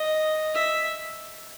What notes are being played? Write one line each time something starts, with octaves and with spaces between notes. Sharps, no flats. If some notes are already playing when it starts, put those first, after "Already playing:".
Already playing: D#5
E5